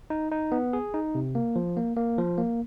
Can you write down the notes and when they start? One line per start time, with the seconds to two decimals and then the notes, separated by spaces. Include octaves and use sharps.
0.10 D#4
0.32 D#4
0.52 B3
0.73 G#4
0.94 D#4
1.15 C3
1.35 A#3
1.56 F3
1.77 A#3
1.96 A#3
2.18 F3
2.38 A#3